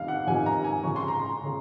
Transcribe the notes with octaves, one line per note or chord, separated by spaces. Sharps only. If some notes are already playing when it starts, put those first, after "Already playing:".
Already playing: F2 C3 D#3 F5
F#5
F2 C3 D#3 G#5
A#5
G#5
F2 C#3 C#6
C6
A#5
C6
C#3